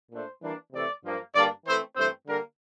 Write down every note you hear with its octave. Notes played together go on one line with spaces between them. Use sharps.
A#2 A3 D4 C5
E3 G3 A#3 D4
C3 E3 A3 C4 D5
G2 F3 A#3
G2 D3 G3 A#3 D4 D5
E3 A3 C4 C5
G2 E3 A3 C4 C5
D3 G3 A#3 D4 A#4